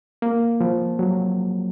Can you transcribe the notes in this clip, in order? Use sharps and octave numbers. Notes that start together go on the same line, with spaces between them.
A#3
F3
F#3